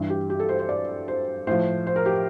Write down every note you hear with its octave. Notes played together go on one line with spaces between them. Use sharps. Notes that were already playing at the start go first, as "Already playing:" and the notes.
Already playing: G2 E3
G4
G4
A4
C5
C5
D5
C5
A2 F3 C5
C5
A#4
G4